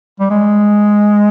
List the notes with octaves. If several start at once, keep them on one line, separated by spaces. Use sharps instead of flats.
G3
G#3